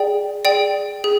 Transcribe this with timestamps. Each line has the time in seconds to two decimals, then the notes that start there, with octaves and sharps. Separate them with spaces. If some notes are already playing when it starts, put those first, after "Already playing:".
Already playing: G#4 D5 G5
0.45 G#4 D5 G5
1.04 G#4